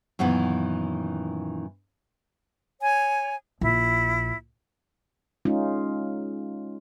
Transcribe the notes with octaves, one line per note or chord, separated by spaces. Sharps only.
F#2 A#2 D#3 E3 B3
C#5 G#5
A#1 E4
G#3 C#4 D#4 F4